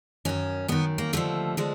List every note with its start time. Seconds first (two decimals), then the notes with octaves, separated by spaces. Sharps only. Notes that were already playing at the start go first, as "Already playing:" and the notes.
0.25 F#2 D#3 C#4
0.68 F#2 D#3 B3
0.98 A#3
1.13 D#2 D3 F3 A3
1.57 D3 F3 G#3